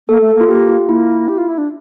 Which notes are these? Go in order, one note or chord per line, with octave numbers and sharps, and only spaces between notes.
A#3 A4
A3
A#3
F4
A#3 G4
F4
A#3 E4
G4
F4
E4
D4